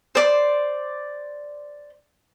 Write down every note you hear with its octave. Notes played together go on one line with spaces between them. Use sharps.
C5 D5